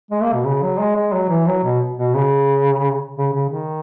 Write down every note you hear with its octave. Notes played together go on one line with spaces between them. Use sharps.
G#3
A#3
B2
C#3
F#3
G#3
G#3
F#3
E3
F#3
B2
B2
C#3
C#3
C#3
D#3